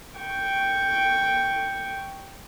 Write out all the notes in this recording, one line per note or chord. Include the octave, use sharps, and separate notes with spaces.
G5 C#6